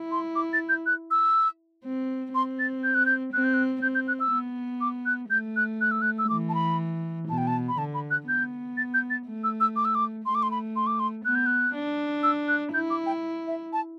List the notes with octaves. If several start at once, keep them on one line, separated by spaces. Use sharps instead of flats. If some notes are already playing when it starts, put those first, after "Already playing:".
Already playing: E4
C6
D6
A6
G6
F#6
E6
C4
C4 C6
A6
G6
F#6
G6
C4 F#6
G6
F#6
C4 G6
G6
F#6
E6
B3
D6
F#6
A3 G6
F#6
F#6
E6
F#6
E6
E3 D6
A5
B5
B2 A5
G5
A5
B5
D3 A5
B5
F#6
B3 G6
A6
G6
A6
A3
E6
E6
D6
E6
D6
A3 C6
D6
C6
B5
C6
D6
C6
B3 F#6
G6
F#6
D4
E6
F#6
E4 G6
D6
G5
E5
A5